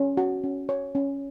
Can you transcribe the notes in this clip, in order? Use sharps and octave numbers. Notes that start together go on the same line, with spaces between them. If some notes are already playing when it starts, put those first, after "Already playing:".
Already playing: C#4
F#4
C#4
C#5
C#4